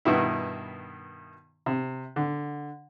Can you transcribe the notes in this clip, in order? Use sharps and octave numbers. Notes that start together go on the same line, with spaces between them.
G2 B2 D#3 E4
C3
D3